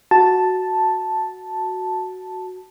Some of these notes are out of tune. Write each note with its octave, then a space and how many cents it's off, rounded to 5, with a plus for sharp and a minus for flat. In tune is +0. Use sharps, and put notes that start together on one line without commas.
F#4 +0 A5 +0